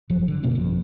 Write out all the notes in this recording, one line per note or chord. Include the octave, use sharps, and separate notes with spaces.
G1 F#2 F3 F#3
D3
F2 B2 A#3 C#4
G1 F2